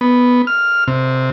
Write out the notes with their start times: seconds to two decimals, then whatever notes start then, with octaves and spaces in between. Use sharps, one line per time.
0.01 B3
0.47 F6
0.88 C3